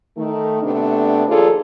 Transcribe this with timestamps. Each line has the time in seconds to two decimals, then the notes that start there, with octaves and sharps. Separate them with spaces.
0.17 D#3 A3
0.63 C3 A3 B3 D4
1.28 D#2 F3 F4 G#4 A4 D5